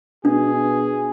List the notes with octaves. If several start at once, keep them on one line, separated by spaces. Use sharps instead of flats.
B2 D4 G#4